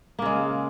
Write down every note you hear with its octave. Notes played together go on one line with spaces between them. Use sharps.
C#3 G#3 A#3